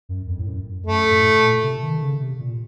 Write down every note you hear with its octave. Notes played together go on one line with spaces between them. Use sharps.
F#2
F2
A2
F#2
F#2 A3
A2
A#2
C3
D#3
C#3
C3
A#2